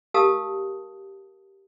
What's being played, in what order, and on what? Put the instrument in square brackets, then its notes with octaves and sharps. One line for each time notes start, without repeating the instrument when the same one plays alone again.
[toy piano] G4 A#4 F5 A5 D#6 E6